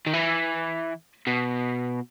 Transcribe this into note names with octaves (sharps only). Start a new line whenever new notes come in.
D#3
E3
B2